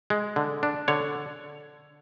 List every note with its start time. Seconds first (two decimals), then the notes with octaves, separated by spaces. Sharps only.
0.10 G#3
0.36 D3
0.63 D4
0.88 D3 C#5